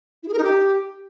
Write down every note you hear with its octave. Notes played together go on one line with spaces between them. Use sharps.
E4
G#4
A#4
D#4
G4